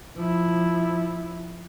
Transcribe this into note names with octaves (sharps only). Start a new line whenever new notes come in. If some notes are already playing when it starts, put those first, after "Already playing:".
F3 E4